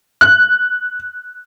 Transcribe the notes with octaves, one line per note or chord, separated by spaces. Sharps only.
F#6